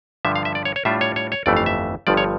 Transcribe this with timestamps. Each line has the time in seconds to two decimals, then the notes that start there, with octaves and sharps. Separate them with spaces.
0.25 G2 D3 F3 E5
0.36 F5
0.45 E5
0.55 D5
0.65 C#5
0.76 C#5
0.85 A2 G3 D4 F4 E5
1.01 C#5
1.16 C#5
1.32 C#5
1.46 G1 F2 E3 A3 D5
1.57 F5
1.66 E5
2.07 G1 G2 F3 D5
2.17 C#5